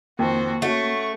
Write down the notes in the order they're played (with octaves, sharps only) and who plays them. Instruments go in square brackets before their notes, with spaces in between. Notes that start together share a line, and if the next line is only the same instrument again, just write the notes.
[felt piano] F2 D#3 [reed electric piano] A#3 [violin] F#4 C5
[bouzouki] A3 [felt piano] C#4 F#4 [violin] C#6